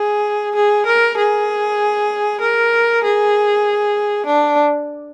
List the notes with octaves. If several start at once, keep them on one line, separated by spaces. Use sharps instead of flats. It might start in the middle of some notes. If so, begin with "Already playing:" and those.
Already playing: G#4
G#4
A#4
G#4
A#4
G#4
D4